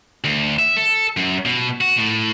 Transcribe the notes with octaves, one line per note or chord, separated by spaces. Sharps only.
D2
E5
A4
F#2
B2
F#4
A2